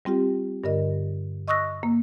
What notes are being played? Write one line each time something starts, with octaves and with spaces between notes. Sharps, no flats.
G3 C4 F4 G4
G2 D3 A#4 D#5
D#5 C#6 D#6 E6 F#6 A#6
A#3